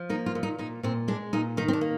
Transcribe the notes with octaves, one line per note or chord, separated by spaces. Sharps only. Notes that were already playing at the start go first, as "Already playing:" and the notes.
Already playing: F3
A#3 D#4
F4
A#2
D#4
A#2 D#4
A#2 C4
G#3 D4
A#2 D#4
D#3 D#4
C4
D4
A#3